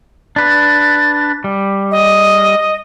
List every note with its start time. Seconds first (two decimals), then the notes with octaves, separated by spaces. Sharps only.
0.36 D4 B4 A6
1.44 G3
1.91 D#5